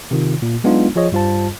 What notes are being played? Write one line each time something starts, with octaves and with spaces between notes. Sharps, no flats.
C3 D#3 F4
A#2
F#3 G#3 B3 D4 D#4 F4
F3 F4 G#4 C#5 D#5
G2 G3 F4 C5 A5